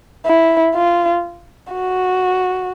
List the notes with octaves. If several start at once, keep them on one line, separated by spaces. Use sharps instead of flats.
E4
F4
F#4